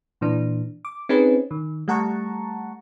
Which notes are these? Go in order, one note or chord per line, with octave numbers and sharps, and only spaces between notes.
A#2 E3 D4
D6
C4 C#4 D#4 G#4 B4
D#3
G3 A3 F#5 A5 A#5 C#6